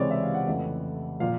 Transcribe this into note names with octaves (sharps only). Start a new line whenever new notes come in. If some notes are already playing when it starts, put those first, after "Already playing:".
Already playing: C#2 C3 E3 G#3 C4 C#5 D5
E5
F5
F#5
F2 C#3 E3 A3
A#2 F3 F5